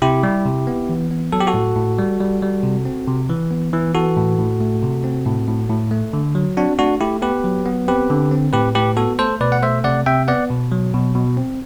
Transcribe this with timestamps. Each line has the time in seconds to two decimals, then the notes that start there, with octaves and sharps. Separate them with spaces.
0.02 C3 E4 G4
0.23 G3
0.45 C3
0.67 B3
0.89 E3
1.11 B3
1.32 F#3 A4
1.40 G4
1.47 F#4 A4
1.54 A2
1.76 A2
1.99 G3
2.20 G3
2.42 G3
2.64 C3
2.85 C4
3.07 C3
3.29 E3
3.51 B3
3.73 E3
3.95 E3 F#4 A4
4.17 A2
4.38 A2
4.61 A3
4.83 C3
5.04 C4
5.26 A2
5.48 A2
5.69 A2
5.91 A3
6.13 D3
6.35 F#3
6.57 C4 D4 F#4
6.79 A3 D4 F#4
7.01 A3 E4 G4
7.22 B3 G4 B4
7.44 F#3
7.66 B3
7.88 C4 G4 B4
8.10 D3
8.31 C4
8.53 A2 G4 B4
8.75 A2 G4 B4
8.97 B3 F#4 A4
9.19 A3 A4 C5
9.41 B2 B4 D5
9.52 F#5
9.62 A3 C5 E5
9.84 C3 D5 F#5
10.06 C3 E5 G5
10.28 B3 D5 F#5
10.50 B2
10.72 F#3
10.94 B2
11.15 B2
11.37 C4